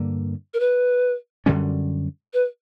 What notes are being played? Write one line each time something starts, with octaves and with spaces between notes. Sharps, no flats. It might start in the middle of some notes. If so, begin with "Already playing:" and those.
Already playing: G2 D3 A#3
A#4
B4
F#2 D3 G3 C#4
B4